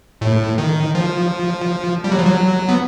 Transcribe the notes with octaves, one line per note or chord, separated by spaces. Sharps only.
A2
D#3
F3
G3
F#3
F3
F#3
B3